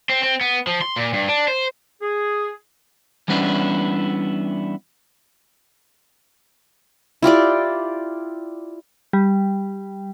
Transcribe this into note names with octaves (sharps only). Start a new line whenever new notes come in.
C4
C4
B3
F3
C6
A#2
G2
D4
C5
G#4
E3 G3 B3 C#4 D4 E4
E4 F4 G4 D5
G3